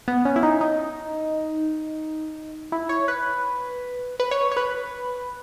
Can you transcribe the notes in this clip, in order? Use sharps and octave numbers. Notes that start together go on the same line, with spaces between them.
B3
C#4
E4
D#4
D#4
E4
C#5
B4
B4
C#5
C#5
B4